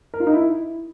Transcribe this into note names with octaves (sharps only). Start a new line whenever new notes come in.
A#4
F4
D#4
E4